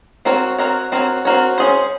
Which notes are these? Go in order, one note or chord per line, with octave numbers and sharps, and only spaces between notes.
C4 F#4 A#4 C#5
C4 F#4 A#4 C#5
C4 F#4 A#4 C#5
C4 F#4 A#4 C#5
C#4 G#4 C5